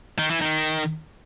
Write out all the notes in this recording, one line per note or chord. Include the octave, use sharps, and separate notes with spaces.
D#3
E3
D#3